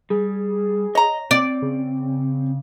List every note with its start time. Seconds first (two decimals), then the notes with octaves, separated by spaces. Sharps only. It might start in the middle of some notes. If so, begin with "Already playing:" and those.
0.10 G3 G#4
0.95 C#5 D#5 A#5
1.31 C4 D5
1.62 C#3